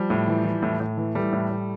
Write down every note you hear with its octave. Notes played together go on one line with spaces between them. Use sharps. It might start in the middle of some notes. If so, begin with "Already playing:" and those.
Already playing: F3 G3
A2
E3
E3
A2
A2
E3
E3 G3 A3
A2
A2